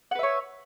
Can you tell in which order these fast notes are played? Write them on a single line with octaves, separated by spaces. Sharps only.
F#5 B4 E5 C#5